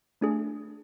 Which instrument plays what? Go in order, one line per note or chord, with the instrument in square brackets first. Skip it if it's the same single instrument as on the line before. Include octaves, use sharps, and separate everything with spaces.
[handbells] A3 D4 G#4